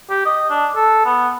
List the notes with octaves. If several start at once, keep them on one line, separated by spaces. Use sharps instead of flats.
G4
D#5
D4
A4
B3